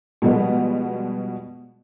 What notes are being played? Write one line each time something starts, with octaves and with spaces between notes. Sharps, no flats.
B2 F3 G3 G#3 B3